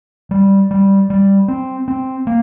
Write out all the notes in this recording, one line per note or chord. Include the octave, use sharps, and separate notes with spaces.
G3
G3
G3
C4
C4
A#3